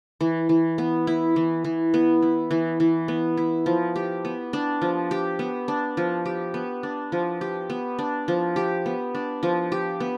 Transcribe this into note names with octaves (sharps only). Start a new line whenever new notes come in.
E3
E3
B3
E4
E3
E3
B3
E4
E3
E3
B3
E4
F3
G4
B3
D4
F3
G4
B3
D4
F3
G4
B3
D4
F3
G4
B3
D4
F3
G4
B3
D4
F3
G4
B3